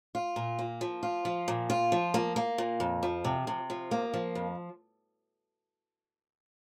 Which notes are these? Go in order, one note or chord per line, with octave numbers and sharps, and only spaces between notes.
F4
A#2
A#3
F3
F4
F3
A#2
F4
F3
A#3
A#3
A#2
F2
F3
C3
C3
F3
A#3
F3
F2